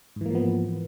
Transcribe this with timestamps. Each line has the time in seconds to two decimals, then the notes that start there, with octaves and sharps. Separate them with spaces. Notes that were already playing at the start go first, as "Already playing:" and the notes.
0.16 G#2
0.21 E3
0.26 A#3
0.30 F3
0.35 B3